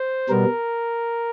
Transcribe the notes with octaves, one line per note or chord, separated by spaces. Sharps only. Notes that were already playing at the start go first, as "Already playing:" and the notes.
Already playing: C5
B2 G3 B3 A#4